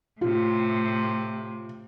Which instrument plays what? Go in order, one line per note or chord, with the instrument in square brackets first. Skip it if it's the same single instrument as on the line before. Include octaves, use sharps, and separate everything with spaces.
[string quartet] A2 C3 [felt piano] F4